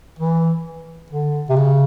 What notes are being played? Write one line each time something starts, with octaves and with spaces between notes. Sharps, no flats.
E3
D3
C3
C#3